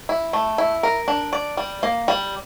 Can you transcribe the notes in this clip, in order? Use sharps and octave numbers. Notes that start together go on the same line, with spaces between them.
E4
A3
E4
A#4
D4
D5
G3
A#3
G3